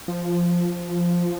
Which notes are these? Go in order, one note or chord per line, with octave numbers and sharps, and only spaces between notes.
F3